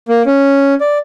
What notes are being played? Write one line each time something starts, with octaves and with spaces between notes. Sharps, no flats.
A#3
C#4
D5